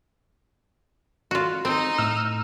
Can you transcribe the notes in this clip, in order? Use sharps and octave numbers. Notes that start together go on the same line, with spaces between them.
F4 F#4
C4 D#4
A2 E6 F6